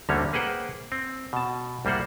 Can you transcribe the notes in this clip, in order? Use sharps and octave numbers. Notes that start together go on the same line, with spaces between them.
D2 D3 G3 A#3 C#4 C#5
A#3 G#4 B4 C5 F#5 G5
C4
B2 A5
C2 G3 A#3 C5 F#5